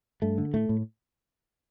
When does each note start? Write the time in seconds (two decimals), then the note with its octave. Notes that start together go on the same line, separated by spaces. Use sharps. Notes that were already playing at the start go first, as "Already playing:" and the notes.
0.22 G2 A3
0.38 D3
0.54 A2 A3
0.69 A2